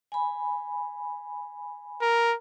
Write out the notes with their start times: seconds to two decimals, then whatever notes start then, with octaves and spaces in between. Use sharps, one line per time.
0.12 G#5 B5
2.02 A#4